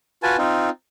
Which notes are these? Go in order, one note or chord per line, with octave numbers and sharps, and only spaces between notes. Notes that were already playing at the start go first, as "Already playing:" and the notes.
F4 F#4 B4 G#5 A5
C4 D#4 F4